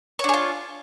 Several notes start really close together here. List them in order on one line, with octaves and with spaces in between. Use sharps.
C#5 D4 G#4 F4